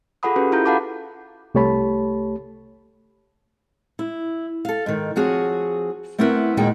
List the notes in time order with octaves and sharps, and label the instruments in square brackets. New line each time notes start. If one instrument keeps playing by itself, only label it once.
[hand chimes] F4 G#4 A4 F#5 B5 D#6
C#4 F#4 G4 A4 B4
E4 F4 A#5 G6
A4 F5 F#5 A5 B5 D6
[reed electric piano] C2 A3 G4 C#5 A5 B5
[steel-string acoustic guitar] E4
A4 F5
G#2 D#3
F3 C4 F#4 G#4 C#5
A3 B3 C4 E4 A#4 B4
D#2 A#2 G#3 D#4 F#4 G5